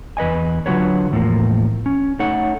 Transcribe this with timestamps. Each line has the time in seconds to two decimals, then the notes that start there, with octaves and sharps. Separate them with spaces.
0.17 E2 B4 D#5 G#5
0.66 D3 F#3 F4 F#4 B4 C#5
1.12 E2 A2 D3 F3 A#3
1.86 C#4
2.19 A3 D#4 C#5 F#5